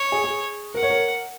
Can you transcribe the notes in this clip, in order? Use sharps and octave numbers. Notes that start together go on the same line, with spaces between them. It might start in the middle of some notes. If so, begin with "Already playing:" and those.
Already playing: C#5
G#4
G#4
A#4 F#5
C#5
A#4